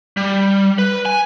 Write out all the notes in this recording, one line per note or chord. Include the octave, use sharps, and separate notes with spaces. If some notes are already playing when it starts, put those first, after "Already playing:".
G3
B4
G#5